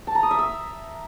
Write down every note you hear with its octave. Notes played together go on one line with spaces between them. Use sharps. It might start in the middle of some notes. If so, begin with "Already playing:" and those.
A5
A#5
D#6
E5
E6